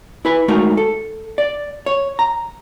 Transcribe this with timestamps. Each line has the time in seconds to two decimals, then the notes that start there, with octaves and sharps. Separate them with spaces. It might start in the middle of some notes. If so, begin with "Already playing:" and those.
0.25 E4 B4 B5
0.48 G#3 A3 D#4 F#4 A#4
0.77 A4
1.38 D5
1.86 C#5
2.19 A#5